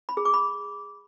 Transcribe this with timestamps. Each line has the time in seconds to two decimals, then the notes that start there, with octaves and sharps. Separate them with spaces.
0.09 B5
0.17 G#4
0.25 D6
0.34 B5